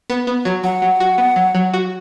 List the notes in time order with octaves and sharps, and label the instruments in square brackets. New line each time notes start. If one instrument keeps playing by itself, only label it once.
[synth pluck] B3
B3
F#3
[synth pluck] F#3 [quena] F#5
[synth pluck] F#3
F#4
B3
F#3
F#3
F#4